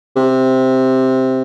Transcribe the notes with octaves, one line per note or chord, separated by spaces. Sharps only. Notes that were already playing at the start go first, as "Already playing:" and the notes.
C3